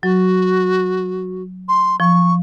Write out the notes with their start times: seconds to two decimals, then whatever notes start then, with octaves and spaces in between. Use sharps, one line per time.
0.03 F#3 F#4
1.69 C6
2.00 F3 C#6